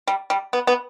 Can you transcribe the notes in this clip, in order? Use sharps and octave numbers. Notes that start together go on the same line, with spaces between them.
G3
G3
B3
B3